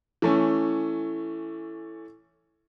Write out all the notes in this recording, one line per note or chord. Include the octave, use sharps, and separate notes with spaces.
E3 A3 C#4